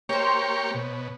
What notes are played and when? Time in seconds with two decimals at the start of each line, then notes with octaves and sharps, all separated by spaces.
0.09 A#3 G4 C5 C#5 C#6
0.74 B2